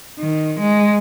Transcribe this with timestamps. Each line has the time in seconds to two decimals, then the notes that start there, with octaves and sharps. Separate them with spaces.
0.19 D#3
0.60 G#3